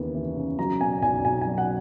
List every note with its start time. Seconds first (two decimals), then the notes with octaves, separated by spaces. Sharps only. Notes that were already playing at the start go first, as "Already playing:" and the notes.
Already playing: D#2 C#3 E3 B3
0.15 E3
0.36 C#3
0.58 F#3 A#5
0.80 B2 G#5
1.02 B1 G#5
1.24 B1 G#5
1.41 F#3 G#5
1.58 F#5